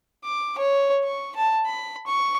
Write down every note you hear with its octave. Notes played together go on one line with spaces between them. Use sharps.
D6
C#5
C#6
A5
B5
C#6